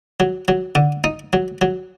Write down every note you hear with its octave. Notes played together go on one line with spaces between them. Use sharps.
F#3
F#3
D3
D#4
F#3
F#3